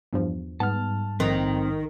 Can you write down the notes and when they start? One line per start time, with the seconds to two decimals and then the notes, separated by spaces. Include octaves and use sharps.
0.13 E2 G2 F3
0.60 G#2 G3 B3 A5 F6
1.20 A#1 D#3 C4 F#6 A6